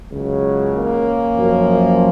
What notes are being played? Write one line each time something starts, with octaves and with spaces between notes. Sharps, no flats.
C#2 C#3 F#3
A#3 C#4
F#2 F3